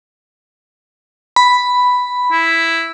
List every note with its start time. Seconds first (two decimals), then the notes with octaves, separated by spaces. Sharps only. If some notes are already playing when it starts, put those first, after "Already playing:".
1.36 B5
2.32 E4